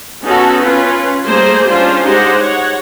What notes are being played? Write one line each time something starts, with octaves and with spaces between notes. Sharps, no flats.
B3 C#4 D#4 F#4 A4
C#4 F4 B4
G3 A3 A#3 G#4 C5
C#4 D4 F4 C5
G#3 D#4 G4 C5 F#5
C#5 F#5